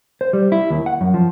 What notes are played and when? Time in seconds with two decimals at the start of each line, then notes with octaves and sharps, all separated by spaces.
0.21 C5
0.33 G3
0.52 E4
0.70 D#2
0.86 F#5
1.01 F#2
1.14 F3